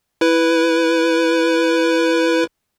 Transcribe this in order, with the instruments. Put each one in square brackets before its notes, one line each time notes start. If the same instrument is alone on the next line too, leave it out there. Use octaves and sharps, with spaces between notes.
[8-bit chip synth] E4 B4